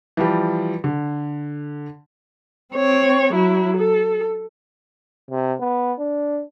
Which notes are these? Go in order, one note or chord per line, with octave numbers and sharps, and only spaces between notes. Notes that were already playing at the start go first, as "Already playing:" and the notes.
E3 F3 G3
D3
C4 C#5
F#3 E4
A4
C3
B3
D4